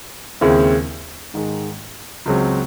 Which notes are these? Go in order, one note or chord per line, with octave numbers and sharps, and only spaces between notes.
D#2 C#3 G#3 C4 E4
G#2 D#3 G#3
C#2 C#3 F#3 C4